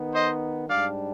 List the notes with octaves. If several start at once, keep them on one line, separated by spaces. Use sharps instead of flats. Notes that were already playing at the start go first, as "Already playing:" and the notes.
Already playing: D#3 B3 D#4
C5 D#5
G#2 G3 D4 D5 F5